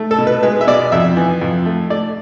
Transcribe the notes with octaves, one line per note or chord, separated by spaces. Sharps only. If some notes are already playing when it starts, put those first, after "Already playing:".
Already playing: A3
A4
B2
B4
G#3 B4
E5
B2 D5
F2 E5
E3
F2
A3
A3 D5